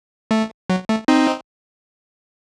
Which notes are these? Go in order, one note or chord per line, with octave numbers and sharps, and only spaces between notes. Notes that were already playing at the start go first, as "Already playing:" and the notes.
A3
F#3
A3
C4 D#4